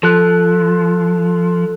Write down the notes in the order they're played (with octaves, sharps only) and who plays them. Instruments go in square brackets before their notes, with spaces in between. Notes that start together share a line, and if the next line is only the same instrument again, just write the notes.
[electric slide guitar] F3 [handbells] A4 F#6